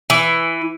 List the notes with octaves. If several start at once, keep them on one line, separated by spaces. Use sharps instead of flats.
E3